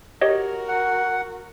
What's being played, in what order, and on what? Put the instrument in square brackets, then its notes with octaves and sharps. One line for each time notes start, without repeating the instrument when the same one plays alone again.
[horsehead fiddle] F#4 A#4 [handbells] G4 C#5 D#5
[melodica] F#5